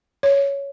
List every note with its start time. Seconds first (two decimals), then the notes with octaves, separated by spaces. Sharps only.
0.23 C#5